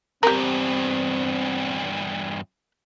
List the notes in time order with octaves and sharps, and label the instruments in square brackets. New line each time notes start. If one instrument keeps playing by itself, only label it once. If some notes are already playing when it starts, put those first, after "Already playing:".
[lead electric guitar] E2 G2 [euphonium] C4 [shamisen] G4 A#4